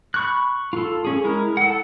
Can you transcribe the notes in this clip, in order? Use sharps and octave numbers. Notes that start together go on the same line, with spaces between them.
B5 C#6 F#6
F4 A4
C#4 G#4
G#3 E4 A#4
A4 F#5